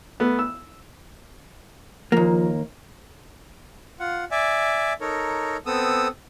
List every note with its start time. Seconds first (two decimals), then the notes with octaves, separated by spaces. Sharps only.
0.20 A3 B3
0.39 E6
2.12 D#2 F3 A#3
4.00 F4 F#5
4.31 D5 E5 G#5
5.01 D#4 A4 A#4 C#5
5.66 B3 C4 A4 D#6 E6